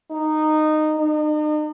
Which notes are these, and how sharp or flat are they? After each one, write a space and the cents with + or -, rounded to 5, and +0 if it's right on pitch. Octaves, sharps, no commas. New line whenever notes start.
D#4 -15
D#4 -40